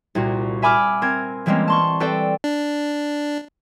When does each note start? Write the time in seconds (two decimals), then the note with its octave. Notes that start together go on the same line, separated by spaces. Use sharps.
0.15 C2 A#2 F#4
0.62 E5 G#5 B5 D6 E6 F6
1.02 C4 A#4 G#6
1.46 E3 G3 G#3 A#3 C4 C#4
1.68 A5 C6 C#6
2.00 C4 A4 B4 D5 G5
2.44 D4